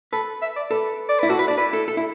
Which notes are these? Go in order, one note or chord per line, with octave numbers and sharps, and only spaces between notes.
A4 B4
E5
D5
A4 B4
D5
E4 B4
F#4 A4
B4
D4 D5
E4 B4
A4
A4
E4